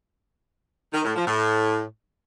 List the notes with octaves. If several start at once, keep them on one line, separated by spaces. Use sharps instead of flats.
D#3
A2
F3
A2